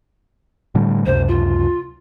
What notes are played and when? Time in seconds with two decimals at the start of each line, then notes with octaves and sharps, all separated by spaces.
0.75 A2 D3 G3
1.06 C#2 F#2 C3 C5
1.28 F4